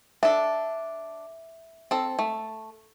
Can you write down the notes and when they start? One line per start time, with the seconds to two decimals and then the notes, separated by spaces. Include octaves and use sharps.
0.23 D4 A4 E5
1.91 C4 A4
2.19 A3